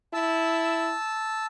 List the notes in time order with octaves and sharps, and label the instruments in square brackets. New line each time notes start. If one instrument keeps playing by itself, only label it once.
[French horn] E4 [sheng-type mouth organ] A5 E6